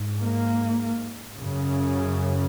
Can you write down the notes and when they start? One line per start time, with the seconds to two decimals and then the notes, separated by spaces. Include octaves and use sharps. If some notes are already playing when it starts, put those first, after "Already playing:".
Already playing: G#2
0.21 A#3
1.38 F#2 C#3